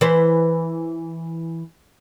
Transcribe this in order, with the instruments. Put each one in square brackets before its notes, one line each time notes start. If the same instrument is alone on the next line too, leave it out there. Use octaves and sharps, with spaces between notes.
[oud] E3 B4 C5